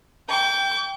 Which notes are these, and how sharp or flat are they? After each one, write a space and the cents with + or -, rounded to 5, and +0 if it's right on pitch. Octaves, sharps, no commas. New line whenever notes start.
G5 +0 D6 -40